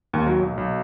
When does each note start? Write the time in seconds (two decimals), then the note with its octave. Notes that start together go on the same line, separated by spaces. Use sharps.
0.13 D#2
0.26 F#3
0.39 B1
0.58 B1